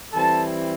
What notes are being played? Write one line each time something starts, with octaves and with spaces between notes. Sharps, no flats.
E3 G3 C4 E4 A4 A5